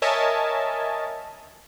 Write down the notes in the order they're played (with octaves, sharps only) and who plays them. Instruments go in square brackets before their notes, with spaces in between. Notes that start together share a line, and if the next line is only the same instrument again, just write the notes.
[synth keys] A#4 C#5 D#5 E5 G#5 A5